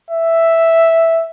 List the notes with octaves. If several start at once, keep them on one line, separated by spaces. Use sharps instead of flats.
E5